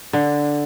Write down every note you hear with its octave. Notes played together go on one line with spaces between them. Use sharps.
D3